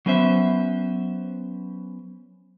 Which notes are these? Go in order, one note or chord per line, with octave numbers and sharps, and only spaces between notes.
F#3 B3 C#4 C5 E5